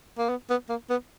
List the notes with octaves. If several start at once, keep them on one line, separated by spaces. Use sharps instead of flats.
A#3
B3
B3
A#3
B3